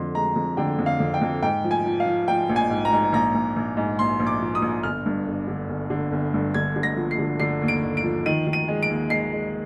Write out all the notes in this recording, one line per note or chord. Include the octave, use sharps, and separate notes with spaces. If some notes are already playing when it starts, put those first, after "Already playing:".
Already playing: F2 D3 C6
G#3 A#5
F2
D3 G5
F2
F5
F2
G5
F2
G#2 G5
F3
G#5
F3
F5
F3
F3 G5
A#1
G#5
G#2
A#5
G#2
A#1 A#5
A#1
A#1
G#2
A#1 C6
A#1
D6
F3
D#6
A#1
G1 F6
G2
G1
D3
G1
D3
G1
G2
D3 G#6
D3
A#6
F3
C7
D3
D3 C7
D#2
D7
D#2
D7
F3
D#3 D#7
D#3
D#7
G#3
D7
D#2
G#3 C7
G#3